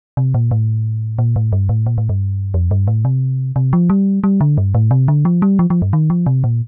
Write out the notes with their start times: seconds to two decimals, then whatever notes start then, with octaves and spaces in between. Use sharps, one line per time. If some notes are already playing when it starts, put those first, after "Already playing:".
0.17 C3
0.34 A#2
0.51 A2
1.19 A#2
1.36 A2
1.52 G2
1.69 A2
1.86 A#2
1.98 A2
2.09 G2
2.54 F2
2.71 G2
2.88 A2
3.05 C3
3.56 C3
3.73 F3
3.90 G3
4.24 G3
4.41 D3
4.58 G2
4.75 A2
4.91 C3
5.08 D3
5.25 F3
5.42 G3
5.59 F3
5.70 F3
5.82 G2
5.93 D#3
6.10 F3
6.26 C3
6.44 A#2